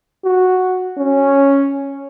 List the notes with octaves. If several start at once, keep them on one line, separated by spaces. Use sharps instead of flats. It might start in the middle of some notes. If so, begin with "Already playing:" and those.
F#4
C#4